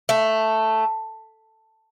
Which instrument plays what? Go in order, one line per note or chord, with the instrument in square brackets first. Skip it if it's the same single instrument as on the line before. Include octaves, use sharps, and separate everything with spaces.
[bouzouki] A3